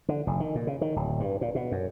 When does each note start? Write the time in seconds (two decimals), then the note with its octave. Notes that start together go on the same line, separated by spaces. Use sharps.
0.09 D3
0.27 F1
0.40 D#3
0.55 A#2
0.67 C#3
0.81 D#3
0.96 D1
1.20 G2
1.41 A#2
1.55 B2
1.72 F#2